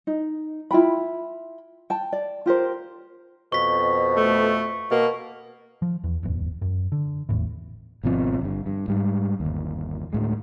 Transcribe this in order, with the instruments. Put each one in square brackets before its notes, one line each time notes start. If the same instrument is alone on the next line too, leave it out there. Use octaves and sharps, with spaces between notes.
[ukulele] D#4
E4 F4 G5 B5
G5 A5
D5
F4 G4 A#4 C5
[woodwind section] F2 B2 [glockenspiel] C#6 B6
[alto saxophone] A3
[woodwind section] B2 [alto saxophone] A#3
[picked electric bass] F3
E2
D1 G1 E2
F#2
D3
G#1 E2 A2
[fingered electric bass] G#1 B2 F3 C4
G1 G2
G2
G#2 G3
G1 D#2
D2 A2 G#3